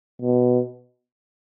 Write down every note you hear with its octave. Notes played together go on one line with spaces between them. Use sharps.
B2